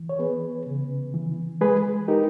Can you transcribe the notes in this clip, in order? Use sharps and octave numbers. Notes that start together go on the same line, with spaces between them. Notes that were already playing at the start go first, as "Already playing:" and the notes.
Already playing: E3
C#5
B3 G#4 B4
C#3
E3
G#3 G#4 B4
D#4 G4 A#4